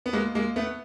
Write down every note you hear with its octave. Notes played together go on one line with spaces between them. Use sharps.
B3
G#3 A#3
G#3 A#3
A3 B3